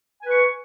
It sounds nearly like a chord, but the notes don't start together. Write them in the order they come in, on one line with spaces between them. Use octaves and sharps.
G#5 B4 C#6